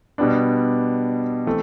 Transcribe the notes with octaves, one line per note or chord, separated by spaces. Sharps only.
B2 G3 B3 D4
E3 A3 C4